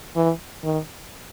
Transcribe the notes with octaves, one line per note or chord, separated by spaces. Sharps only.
E3
D#3